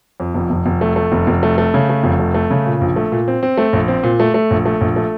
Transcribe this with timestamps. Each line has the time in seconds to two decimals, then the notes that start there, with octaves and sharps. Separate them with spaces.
0.20 F2
0.35 F1
0.50 F1
0.66 F1
0.81 A3
0.96 A3
1.12 F1
1.27 F1
1.43 A3
1.58 A3
1.74 C#3
1.89 A3
2.04 F1
2.19 A3
2.34 A3
2.51 C#3
2.66 A#2
2.81 A#1
2.96 A3
3.12 A#2
3.28 C4
3.43 C4
3.58 A3
3.73 A#1
3.88 C4
4.03 A#2
4.20 A3
4.34 A3
4.51 A#1
4.66 A3
4.81 A#1
4.96 A3